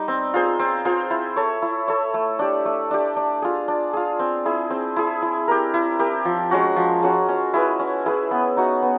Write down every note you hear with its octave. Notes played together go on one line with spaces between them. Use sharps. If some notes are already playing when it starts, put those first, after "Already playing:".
Already playing: G3 D#4
C4
F4 G#4 C5
C4
F4 G#4 C5
E4
A4 C#5
E4
A4 C#5
A3
D4 G4
A3
D4 G4
D4
F4 G#4
D4
F4 G#4
C4
E4 G#4
C4
E4 G#4
E4
G4 A#4
E4
G4 A#4
F3
G#3 C#4 F#4
F3
G#3 C#4 F#4
C#4
E4 G#4 B4
C#4
E4 G#4 B4
B3
D#4 F#4
B3